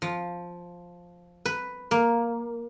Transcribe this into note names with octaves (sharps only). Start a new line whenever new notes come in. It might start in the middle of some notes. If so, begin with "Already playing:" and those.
F3
B4
A#3